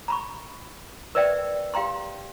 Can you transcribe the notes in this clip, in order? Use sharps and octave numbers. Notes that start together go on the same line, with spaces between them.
A#5 B5 C#6
A#4 B4 D5 E5 G5
G4 F5 G5 A#5 C6